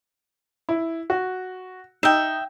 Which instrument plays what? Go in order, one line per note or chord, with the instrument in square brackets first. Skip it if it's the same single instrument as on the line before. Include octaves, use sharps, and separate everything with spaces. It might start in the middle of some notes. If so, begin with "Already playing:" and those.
[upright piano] E4
F#4
[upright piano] D#4 [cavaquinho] E5 G5